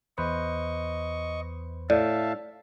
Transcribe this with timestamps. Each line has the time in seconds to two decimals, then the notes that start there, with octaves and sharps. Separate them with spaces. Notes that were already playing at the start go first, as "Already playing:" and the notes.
0.18 E2 B4 C5 D#5 C#6
1.90 A2 D5 E5 F5 A5